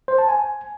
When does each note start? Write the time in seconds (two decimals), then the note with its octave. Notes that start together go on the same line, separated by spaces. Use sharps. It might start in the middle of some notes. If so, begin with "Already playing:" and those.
0.08 C5
0.18 A5
0.29 G#5